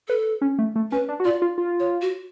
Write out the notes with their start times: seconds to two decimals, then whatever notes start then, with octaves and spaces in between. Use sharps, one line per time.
0.09 A4 B4
0.42 C#4
0.59 A3
0.76 A3
0.92 C#4 B4
1.09 D4
1.20 F#4
1.25 F4 D5
1.42 F4
1.58 F4
1.80 C#5
2.02 F#4